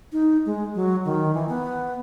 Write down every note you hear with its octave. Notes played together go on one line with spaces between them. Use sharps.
D#4
G#3
F#3
D#3
E3
B3